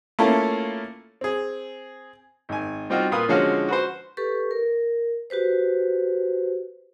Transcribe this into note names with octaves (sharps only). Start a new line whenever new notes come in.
A3 A#3 C#4 E4 F4 A4
C4 G#4
G#1 G#5
G3 C4 D#4 F4 F#4
A#2 F4 B4 F5 D#6
D3 F3 G#3 C#4 F#4 F5
F#4 B4 C5
G4 A4 B4 C#6
A#4
F#4 G4 B4 C5